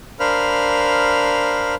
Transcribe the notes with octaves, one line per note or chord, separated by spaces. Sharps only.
D4 A#4 C5 F5 B5 F6